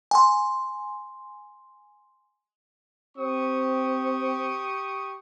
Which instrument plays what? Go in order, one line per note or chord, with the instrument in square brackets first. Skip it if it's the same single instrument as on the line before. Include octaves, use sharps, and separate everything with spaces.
[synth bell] G#5 C6
[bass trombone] C4 [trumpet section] G4 C#6 D#6